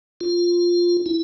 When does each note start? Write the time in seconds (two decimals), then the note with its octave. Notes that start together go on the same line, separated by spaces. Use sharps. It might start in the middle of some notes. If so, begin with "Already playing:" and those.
0.21 F4
1.06 E4